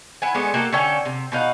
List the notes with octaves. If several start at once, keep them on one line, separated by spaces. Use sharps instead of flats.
E4 F#5 G#5
G#3 A3 B3 D4
A#3 F#4 G4 A4
D3 C#4 A4 G5
C3
B2 D#4 F5 F#5